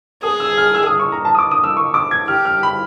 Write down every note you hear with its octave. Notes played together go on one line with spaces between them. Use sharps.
G#4 D#6
E6
F6
E6
D#6
C#6
A#5
A5
D#6
D6
D#6
E6
C#6
D6
G#6
G4 F6
F6
B5